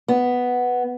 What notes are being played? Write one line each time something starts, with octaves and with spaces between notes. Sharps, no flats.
B3